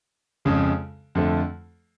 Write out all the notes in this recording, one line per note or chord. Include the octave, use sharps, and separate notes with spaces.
F2 C#3 G#3
F2 D3 F3 A3